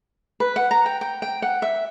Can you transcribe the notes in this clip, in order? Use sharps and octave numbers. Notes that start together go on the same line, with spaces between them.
B4
F#5
A#5
G5
G5
G5
F#5
E5